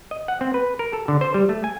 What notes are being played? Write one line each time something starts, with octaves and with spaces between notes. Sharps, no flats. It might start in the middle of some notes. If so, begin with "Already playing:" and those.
D#5
F#5
C4
B4
A#4
A4
D3
C5
G3
A3
G#5